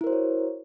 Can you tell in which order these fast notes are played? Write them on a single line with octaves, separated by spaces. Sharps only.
E4 A#4 C5 F#4 C#5